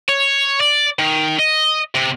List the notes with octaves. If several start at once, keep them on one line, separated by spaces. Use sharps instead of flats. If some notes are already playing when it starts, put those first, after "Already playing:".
C#5
D5
D#3
D#5
C3